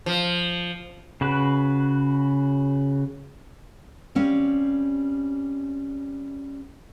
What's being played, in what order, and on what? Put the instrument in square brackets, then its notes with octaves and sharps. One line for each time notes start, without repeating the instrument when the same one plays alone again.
[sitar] F3
[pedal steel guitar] C#3 F#4 B4
[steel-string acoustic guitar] G3 C4 C#4 F5